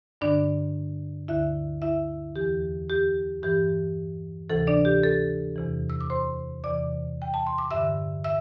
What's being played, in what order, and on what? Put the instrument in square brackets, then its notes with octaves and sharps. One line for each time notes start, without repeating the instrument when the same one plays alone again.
[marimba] G2 D3 D4 D5
D2 D3 E4 E5
E4 E5
E2 E3 G4
G4
G2 E3 G4
D2 C3 E3 A4
D4 D5
G4
A4
E2 C3 E3
E6
D6
C5 C6
E2 C3 E3 D5 D6
G5
A5
C6
D6
G2 D3 E5 E6
E5 E6